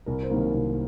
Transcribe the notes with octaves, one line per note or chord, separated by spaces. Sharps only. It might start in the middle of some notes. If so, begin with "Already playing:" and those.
C2 A#4
C5
C3 D#3 F#3 A#3
A#4
C2